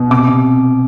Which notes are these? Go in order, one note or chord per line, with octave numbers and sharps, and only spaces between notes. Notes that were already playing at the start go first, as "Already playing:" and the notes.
Already playing: B2
C3 D6
C3